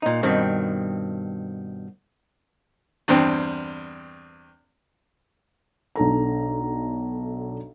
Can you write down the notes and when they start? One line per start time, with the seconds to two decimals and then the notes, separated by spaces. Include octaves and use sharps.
0.02 A#2 D#4
0.23 G2 B2 D#3 C4
3.08 E2 G2 C4
5.96 B1 D4 A4 A#5